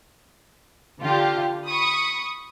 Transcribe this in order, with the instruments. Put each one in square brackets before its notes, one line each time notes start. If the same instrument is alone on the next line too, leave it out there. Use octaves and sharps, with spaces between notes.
[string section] D3 F4 G4
B5 C#6 D#6